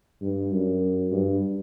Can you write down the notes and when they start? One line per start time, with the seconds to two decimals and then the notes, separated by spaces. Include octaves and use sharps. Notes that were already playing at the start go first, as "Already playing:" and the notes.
0.22 G2
0.52 F#2
1.12 G2